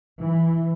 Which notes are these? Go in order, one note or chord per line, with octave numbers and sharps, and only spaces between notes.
E3